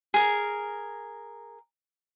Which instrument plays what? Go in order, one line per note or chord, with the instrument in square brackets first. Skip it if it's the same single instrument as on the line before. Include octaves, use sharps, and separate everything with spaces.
[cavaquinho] G#4 A#4